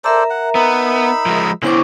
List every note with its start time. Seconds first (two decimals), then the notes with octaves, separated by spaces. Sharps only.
0.04 A4 A#4 C5 D5 E5 A#5
0.30 F#5
0.55 B3 D#4 B5 E6
1.26 F3 G#3
1.63 D3 B3 C#4 E4 C5 C#6 D6